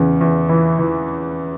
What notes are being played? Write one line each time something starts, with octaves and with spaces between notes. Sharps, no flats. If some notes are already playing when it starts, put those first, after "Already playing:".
Already playing: E2 C#3
E2
E3
E3